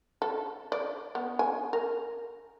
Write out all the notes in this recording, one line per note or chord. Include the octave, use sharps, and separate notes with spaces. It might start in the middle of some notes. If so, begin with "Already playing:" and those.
A4
D5
B3
G#5
A#4